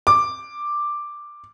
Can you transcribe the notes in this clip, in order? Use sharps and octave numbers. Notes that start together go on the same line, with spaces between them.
D6